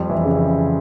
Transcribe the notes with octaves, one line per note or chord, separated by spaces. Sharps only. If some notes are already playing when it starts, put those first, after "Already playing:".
Already playing: F2 G3
E3
C#3